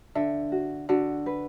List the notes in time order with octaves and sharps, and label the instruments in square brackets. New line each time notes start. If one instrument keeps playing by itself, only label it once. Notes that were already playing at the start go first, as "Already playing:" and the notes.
[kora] D3 [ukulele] E5
[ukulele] F#4
[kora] D3 [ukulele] F#4
[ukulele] B4